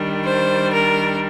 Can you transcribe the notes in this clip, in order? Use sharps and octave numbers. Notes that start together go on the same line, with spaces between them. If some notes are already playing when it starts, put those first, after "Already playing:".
Already playing: D#3 G3 D4
C5
A#4